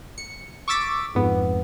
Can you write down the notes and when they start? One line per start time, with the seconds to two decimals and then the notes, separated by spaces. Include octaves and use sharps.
0.18 C#7
0.68 C#6 D6 E6 A6 B6 D7
1.15 F2 G#2 B3